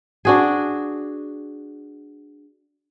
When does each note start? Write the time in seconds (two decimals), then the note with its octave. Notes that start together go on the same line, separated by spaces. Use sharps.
0.25 D4 F#4 G#4